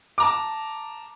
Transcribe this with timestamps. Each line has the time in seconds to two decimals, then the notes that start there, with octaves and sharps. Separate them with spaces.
0.18 A5 A#5 D6